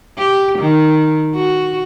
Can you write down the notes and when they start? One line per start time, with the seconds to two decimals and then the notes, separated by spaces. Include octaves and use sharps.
0.18 G4
0.59 D#3
1.35 F#4